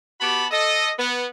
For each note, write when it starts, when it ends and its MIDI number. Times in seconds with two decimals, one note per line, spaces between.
0.21 0.46 59
0.21 0.46 66
0.21 0.46 67
0.21 0.46 81
0.21 0.46 83
0.51 0.91 69
0.51 0.91 75
0.99 1.26 59